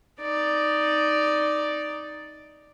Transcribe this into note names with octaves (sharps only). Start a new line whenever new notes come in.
D#4 D5